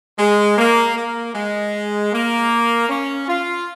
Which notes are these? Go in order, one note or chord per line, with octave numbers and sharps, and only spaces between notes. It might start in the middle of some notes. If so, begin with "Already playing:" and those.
G#3
A#3
A#3
G#3
A#3
C#4
F4